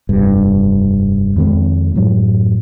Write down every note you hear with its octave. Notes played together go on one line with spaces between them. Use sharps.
F1 G2
F2 D#3 G#3 C4
F#2 A2 F#3